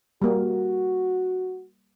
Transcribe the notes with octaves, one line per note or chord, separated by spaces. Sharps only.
G3 A#3 F#4